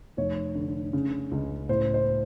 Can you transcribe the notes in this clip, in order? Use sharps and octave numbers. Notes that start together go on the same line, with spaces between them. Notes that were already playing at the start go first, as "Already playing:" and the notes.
F1 C#5
D3
C#3
C#2
A2 C5
C5